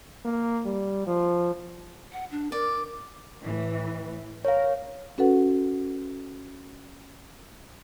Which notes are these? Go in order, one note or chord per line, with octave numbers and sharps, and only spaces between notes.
A#3
G3
F3
F#5
D4
A#4 D5
A2 E3
A#4 C#5 F5
C#4 F#4 A4 B4 F#5